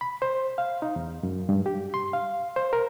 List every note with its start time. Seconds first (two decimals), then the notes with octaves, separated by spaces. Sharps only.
0.01 B5
0.22 C5
0.58 F5
0.82 D#4
0.96 E2
1.23 F#2
1.49 G2
1.66 G4
1.94 C6
2.13 F5
2.56 C5
2.73 A#4